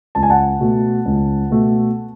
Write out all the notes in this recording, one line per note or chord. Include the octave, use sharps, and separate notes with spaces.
C#2 A5
G#5
F#5 A5
B2 A3
C#2
B2 A3